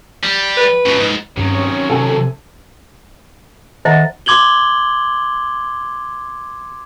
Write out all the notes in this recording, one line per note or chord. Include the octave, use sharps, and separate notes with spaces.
G3
B4
C#2 B2
G#2
G2 D#3 F#3 C4 C#4 C#5
C3 A4 G#5
D#3 C5 D#5 E5 F#5 A#5
C6 D6 G#6 F#7 G7